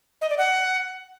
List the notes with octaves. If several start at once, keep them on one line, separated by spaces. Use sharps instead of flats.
D#5
D5
F#5